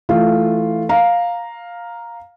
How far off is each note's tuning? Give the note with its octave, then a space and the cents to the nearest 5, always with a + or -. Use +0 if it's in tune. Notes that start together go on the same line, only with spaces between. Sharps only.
E3 +10 A3 +0 F4 -5
F5 +5 A#5 +0